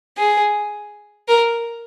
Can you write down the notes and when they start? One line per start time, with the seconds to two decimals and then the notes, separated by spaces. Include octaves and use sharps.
0.17 G#4
1.28 A#4